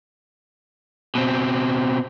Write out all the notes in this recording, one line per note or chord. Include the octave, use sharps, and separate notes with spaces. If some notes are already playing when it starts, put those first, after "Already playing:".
B2 C4